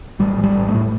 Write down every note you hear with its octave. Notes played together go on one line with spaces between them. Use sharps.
A1 G3
A1
G3
A2
A3
A2